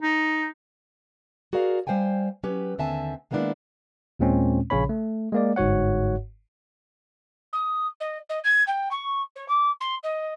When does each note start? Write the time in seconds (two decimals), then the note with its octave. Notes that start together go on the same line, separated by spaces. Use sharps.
0.01 D#4
1.53 F#4 G#4 A#4 D5 F5
1.87 G3 C5 F5 G5 G#5
2.43 F#3 C#4 G4 B4
2.78 D#2 D3 C4 E5 G#5 A5
3.31 D#3 G#3 A#3 B3 D4 E4
4.19 D#2 A#2 G#3 C4 C#4
4.70 A#1 C#3 C#4 C#5 B5
4.89 A3
5.32 G#3 A#3 D5
5.56 G1 G#2 F#4 C#5 F#5
7.53 D#6
8.00 D#5
8.29 D#5
8.44 G#6
8.67 G5
8.91 C#6
9.36 C#5
9.48 D6
9.80 C6
10.03 D#5